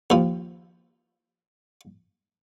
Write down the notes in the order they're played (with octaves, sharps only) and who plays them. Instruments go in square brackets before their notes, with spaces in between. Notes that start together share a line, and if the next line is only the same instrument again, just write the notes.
[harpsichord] D#2 F3